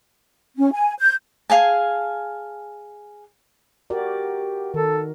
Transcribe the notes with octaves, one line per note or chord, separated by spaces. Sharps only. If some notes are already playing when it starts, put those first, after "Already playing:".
C#4
G#5
G6
G#4 F5 G#5 A5
F#4 G4 A#4 D5
D#3 A4 A#4